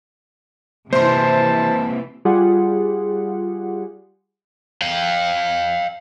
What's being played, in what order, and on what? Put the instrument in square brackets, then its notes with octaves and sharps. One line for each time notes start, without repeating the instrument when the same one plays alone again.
[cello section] C3 E3 [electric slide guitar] A#3 C4 E5 [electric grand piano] C5 C6 [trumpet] A5
[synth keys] G3 F4 G4 G#4 F#5
[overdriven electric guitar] F5 G5